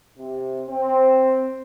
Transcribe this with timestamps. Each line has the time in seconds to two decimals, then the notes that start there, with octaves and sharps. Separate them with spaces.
0.17 C3
0.68 C4